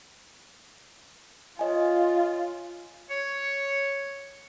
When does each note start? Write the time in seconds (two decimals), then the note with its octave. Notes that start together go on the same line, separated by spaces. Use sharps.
1.59 F4 C#5 D#5 G#5
3.11 C#5